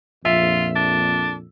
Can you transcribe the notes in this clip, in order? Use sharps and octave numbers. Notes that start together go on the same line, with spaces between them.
A#1 F2 F4 E5
D4